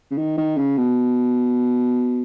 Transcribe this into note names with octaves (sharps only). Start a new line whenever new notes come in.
C#3
D#3
D#3
C#3
B2